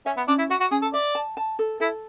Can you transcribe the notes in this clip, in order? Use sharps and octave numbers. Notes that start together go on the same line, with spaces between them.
C#4 E5
B3
C#4 D4
E4
F#4 E5
F#4
C#4 G#4
A4
D5 E5
A5
A5
A4
E4 A4